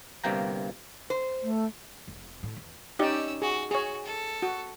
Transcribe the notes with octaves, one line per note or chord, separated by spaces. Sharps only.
G1 G2 C3 A#3 G5 A#5
C5
A3
F1
A2
E2
C#4 D#4 G4 D5 E6
F#4 G#4
F#4 G#4 C#5
A4
F#4